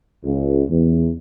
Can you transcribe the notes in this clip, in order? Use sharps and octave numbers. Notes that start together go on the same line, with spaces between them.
C#2
E2